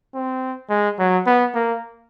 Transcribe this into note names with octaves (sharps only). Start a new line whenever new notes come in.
C4
G#3
F#3
B3
A#3